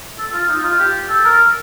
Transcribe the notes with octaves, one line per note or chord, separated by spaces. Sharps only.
A4
F4
D#4
F4
G4
A4
A#4